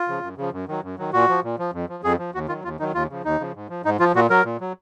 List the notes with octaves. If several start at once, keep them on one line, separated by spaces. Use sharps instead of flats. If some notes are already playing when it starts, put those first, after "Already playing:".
Already playing: F4
C#3 F3
F#2
C#3 F3
F#2
D#3 F#3
F#2
D#3 F#3
A#2 F#4
F3
A#2
F3
F2
F3
F2 G#4
F3
D#2 F#4
D#3 F#3 F4
D#2 F4
D#3 F#3 D#4
D#2 F4
C#3 F3
D#2 D#4
C#3 F3
G#2
F3
G#2 D#4
F3 F4
A#2 F#4
F#3 A#4
A#2
F#3